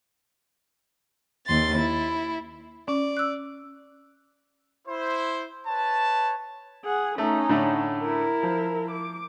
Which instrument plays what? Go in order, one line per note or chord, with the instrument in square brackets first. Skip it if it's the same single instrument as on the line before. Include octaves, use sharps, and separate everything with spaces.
[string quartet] D#2 C6 A6
E4
[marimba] C#4 [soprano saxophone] D5
[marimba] E6 F#6
[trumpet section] E4 C5
B4 C#5 A5
[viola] G#4 F#5
[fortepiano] A3 [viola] C#4 D#4
[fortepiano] A2 D3 A3
[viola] E4 A#4
[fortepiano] F3
[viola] D6